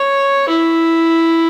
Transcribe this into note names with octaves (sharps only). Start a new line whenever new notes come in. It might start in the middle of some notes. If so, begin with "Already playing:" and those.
Already playing: C#5
E4